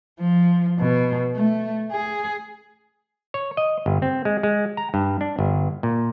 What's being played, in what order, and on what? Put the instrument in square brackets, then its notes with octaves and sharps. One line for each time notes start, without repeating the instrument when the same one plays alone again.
[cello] F3
B2
A3
G#4
[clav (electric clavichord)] C#5
D#5
G1
C4
G#3
G#3
A#5
G2
D4
G1
A#2